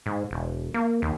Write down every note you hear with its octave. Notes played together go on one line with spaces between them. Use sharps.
G#2
E1
A#3
D#2